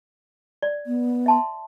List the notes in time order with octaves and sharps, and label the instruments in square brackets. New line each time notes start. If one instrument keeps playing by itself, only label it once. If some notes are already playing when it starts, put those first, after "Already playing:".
[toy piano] D5
[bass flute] B3
[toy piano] E5 A5 C6